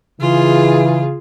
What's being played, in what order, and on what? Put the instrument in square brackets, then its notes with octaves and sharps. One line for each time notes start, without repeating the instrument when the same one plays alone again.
[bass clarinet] C#3 [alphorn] E3 [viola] F4 G#4